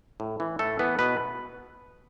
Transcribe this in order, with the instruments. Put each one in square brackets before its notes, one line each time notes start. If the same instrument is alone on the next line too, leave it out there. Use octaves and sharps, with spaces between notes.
[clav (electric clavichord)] A2
E3
A2 A3 A4
E3 B3 B4
B2 B3 B4